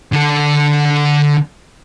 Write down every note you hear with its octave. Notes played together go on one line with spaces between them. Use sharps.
D3 A4